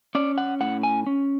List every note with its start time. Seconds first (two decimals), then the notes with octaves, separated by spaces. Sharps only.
0.15 C#4 D5
0.38 F#5
0.60 A2 F#5
0.83 G#5
1.07 C#4